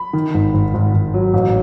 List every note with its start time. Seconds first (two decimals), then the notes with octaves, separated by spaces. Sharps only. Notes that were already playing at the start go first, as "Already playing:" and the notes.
Already playing: B5
0.13 D#3
0.34 G#1
0.54 G#1
0.74 G#1
0.94 G#1
1.14 F#3
1.34 A1